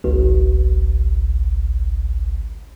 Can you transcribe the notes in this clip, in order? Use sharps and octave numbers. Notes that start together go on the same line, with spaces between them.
G#1 C#2